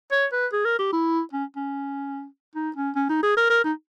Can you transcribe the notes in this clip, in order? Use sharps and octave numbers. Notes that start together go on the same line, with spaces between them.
C#5
B4
G#4
A#4
G4
E4
C#4
C#4
D#4
C#4
C#4
D#4
G#4
A#4
A#4
D#4